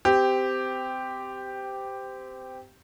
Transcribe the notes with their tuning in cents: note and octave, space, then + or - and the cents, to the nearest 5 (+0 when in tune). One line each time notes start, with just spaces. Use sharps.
C4 -25 G4 +0